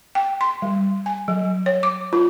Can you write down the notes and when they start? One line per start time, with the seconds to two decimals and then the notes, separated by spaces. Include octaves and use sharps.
0.15 G5
0.41 C6
0.62 G3
1.06 G#5
1.28 F#3
1.66 C#5
1.83 D6
2.13 F4